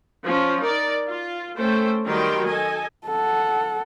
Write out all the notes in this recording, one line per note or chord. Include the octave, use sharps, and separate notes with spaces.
F3 C#4
D#4 A#4 D5
F4
A3 C#4 A4 C5 G5
D#3 F#3 G3 G5 C6
A4 D#5 G#5
A4 F#5